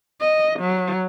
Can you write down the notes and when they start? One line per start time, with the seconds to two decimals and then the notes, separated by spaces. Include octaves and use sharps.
0.21 D#5
0.59 F#3